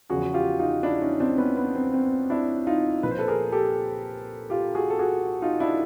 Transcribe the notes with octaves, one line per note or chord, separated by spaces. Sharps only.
E2 C#3 F3 F#4 G#4
F4 G4
D#4 F4
D4 E4
C#4 D#4
C4 D4
B3 C#4
B3
C4
C4
D4 E4
D#4 F4
A#2 F3 B4
C5
A4 B4
G#4 A#4
G4 A4
F4 G4
F#4 G#4
A4
F#4 G#4
D#4 F4
D4 E4